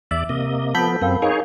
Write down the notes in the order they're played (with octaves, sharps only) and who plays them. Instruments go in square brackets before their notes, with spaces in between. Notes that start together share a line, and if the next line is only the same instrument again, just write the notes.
[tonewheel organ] E2 D5 [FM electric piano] E5
[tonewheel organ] C3 A#3 D#5
[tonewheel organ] F3 B3 [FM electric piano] A4 B5 G6 [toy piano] F#5 A5
[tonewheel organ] F#2 C4 [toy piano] A#4 F5 G5
[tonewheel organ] D#4 G#4 C#5 [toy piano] A#4 F5 G#5